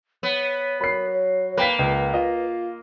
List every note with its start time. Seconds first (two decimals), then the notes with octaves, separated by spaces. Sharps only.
0.23 B3 C#5
0.81 F#3 A#4 B5 C7
1.14 C#5
1.57 A#3 B4 G5 B6
1.79 C#2 B4
2.14 F4 D#5